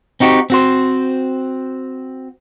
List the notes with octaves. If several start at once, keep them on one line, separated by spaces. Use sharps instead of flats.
C4 D#4 F#4 G4
C4 F#4 C5